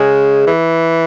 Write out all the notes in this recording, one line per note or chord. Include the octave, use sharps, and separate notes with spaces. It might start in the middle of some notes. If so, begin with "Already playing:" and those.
Already playing: C#3 G#3
E3